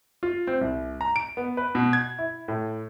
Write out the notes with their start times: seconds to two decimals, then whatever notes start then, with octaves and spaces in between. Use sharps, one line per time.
0.23 F4
0.47 C4
0.61 C2
1.01 A#5
1.16 D7
1.37 B3
1.57 B4
1.75 B2
1.93 G#6
2.18 E4
2.48 A2